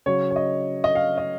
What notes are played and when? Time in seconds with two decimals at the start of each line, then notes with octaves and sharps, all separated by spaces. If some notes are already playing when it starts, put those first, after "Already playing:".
0.06 C#3 F#3 C#5
0.30 C#5
0.36 D#5
0.84 D#5
0.95 F5
1.18 D#5